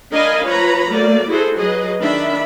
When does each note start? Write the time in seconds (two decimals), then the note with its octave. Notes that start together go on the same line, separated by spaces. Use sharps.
0.13 D4 A#4 D#5 F5 G#5 B5
0.44 F3 B4 C#5 A#5 B5
0.91 F#3 A3 A#3 D5
1.28 E4 F#4 G#4 A4 C5
1.58 F#3 G#4 B4 D#5
2.00 D#3 D4 E5 B5